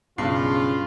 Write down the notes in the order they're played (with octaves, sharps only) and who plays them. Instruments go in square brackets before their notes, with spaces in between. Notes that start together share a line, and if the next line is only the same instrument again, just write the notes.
[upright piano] B1 [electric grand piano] G2 C7 [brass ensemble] C#3 [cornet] F4